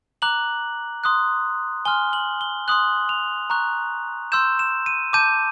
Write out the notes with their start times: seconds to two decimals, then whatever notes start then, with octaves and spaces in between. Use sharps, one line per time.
0.22 A#5 D6 F#6 F#7
1.04 C6 D#6 F#6
1.85 G#5 C6 F6 G7
2.13 F#7
2.41 G7
2.68 C6 D#6 F#6 F#7
3.09 F7
3.50 A#5 C#6 F#6
4.32 C6 E6 G6 E7
4.59 E7
4.86 D#7
5.13 A5 D6 G6 D#7